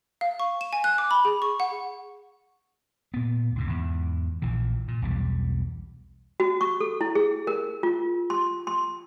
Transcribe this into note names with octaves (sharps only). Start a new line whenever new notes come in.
F5
C#6
E7
G#5
F#6
D6
B5
G#4
C#6
F#5
A#2 B3
D2 G#2 C3
E2 G#2
A#1 A#2 E3
A#2
B1 E2 G3
F#4
C#6
A4
E4
G#4
A#4
F4
C6
C6